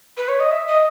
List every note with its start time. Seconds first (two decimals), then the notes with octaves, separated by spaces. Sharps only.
0.17 B4
0.28 C#5
0.39 D#5
0.51 E5
0.67 D#5